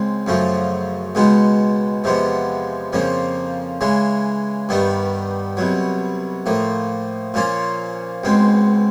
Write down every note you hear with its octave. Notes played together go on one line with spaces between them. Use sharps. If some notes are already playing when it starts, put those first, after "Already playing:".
Already playing: C#2 G#3 C4
F#2 C#3 F3 A3
C#2 B2 G#3 B3 D#4
E2 C3 F3 G#3 B3
F2 C#3 F3 A#3
C#3 E3 G#3
G2 D#3 G3 B3
C2 B2 F#3
A2 F3 A#3
A#2 F3 A#3 C#4 F4
C#2 B2 G#3 C4